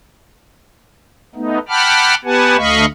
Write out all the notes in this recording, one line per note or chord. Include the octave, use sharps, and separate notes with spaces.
A3 B3 D#4
F#5 G5 A5 B5 D6 F6
B3 G4 B4 F#5 G#5 A5
D2 A3 D#5 F5 B5 C#6